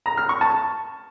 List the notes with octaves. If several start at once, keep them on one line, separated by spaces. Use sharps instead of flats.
A#5
F6
C#6
A5